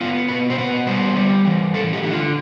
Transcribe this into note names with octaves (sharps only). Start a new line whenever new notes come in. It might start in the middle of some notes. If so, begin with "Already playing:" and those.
B3 F4
B2 B4
C5
B3 B4
G3 C5
G3
E3
A3 A4
G4
D3
F4